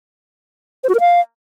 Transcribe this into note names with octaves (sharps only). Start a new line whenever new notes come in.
C5
F#4
A#4
F5